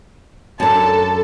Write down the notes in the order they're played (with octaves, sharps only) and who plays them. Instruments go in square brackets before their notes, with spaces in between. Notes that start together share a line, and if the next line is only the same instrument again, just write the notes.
[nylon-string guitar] F#2 D4 [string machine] A4 [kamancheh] A5